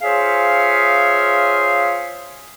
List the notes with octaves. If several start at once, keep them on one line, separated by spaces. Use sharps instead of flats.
F4 G#4 C5 C#5 E5 F5